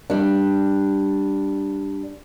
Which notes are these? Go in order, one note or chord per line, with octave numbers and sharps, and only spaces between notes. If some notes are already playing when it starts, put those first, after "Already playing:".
G3 D4